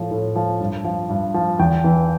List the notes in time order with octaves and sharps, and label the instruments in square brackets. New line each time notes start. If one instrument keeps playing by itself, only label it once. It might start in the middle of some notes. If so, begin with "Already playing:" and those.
Already playing: [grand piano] A2 F3
A2
F3
G2
F3
G2
F3
E2 G5
E3